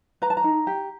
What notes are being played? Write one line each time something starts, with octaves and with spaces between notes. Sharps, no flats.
B4 A#5
A5
A#5
D#4
G4